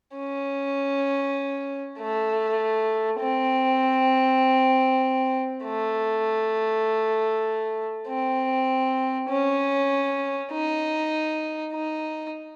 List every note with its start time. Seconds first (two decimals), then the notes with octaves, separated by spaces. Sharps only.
0.16 C#4
1.99 A3
3.20 C4
5.65 A3
8.08 C4
9.29 C#4
10.51 D#4
11.74 D#4